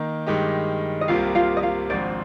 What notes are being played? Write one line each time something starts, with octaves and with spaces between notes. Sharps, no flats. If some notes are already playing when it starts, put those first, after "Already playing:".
Already playing: D#3 A#3 D#4
G2 D#3 G#3 D#4 G4
D#5
C2 C3 G3 A#3 F4 F5
F4 F5
D#5
F4 F5
G#1 G#2 F3 C4 D4 F4 D5